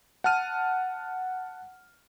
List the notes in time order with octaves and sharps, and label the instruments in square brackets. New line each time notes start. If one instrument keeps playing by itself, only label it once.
[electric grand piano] F#5 A5 F6 D#7